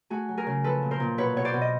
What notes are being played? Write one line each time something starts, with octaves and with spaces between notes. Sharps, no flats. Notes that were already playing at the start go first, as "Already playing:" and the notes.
A3 F#4 G#4
F#3
G#4 A#4
C#3
F3 A4 B4
A#2
A#4 C5
A#2
B2 B4 C#5
B2 C#5
C5 D5
B2
D#5